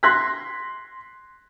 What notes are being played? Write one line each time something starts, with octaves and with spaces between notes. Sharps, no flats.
C6 F#6 G#6 A#6 B6